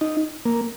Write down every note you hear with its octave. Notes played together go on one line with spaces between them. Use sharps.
D#4
A#3